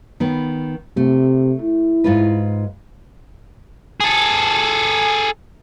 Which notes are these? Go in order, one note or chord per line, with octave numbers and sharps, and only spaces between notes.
D#3 B3
C3 A3
E4
G#2 F4 B4
G#4 A4